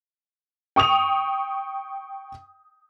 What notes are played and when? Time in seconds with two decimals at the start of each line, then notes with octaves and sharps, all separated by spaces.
0.76 G5 C#6 D#6 F7